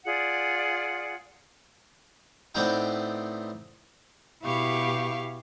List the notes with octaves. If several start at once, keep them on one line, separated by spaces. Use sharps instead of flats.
F4 G#4 D5 F#5
A2 B3 C4 D4 D#4 G5
B2 E4 G4 F5 C#6